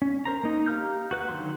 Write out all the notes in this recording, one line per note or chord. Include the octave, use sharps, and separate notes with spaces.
C#4
A#4 C5 A#5
A#3 D#4
G4 F5 A#5 F6 G6
F#4 B4 F#6
D3 D#3 F#3 C6